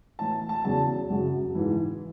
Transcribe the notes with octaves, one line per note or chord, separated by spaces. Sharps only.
A2 E3 A5
A5
E2 C#3 F#3 A5
F#2 C#3 F#3
G#2 E3